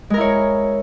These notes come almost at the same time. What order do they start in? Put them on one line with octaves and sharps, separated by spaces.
G#3 A#4 E4 C#5